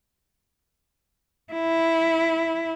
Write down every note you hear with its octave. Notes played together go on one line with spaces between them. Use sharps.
E4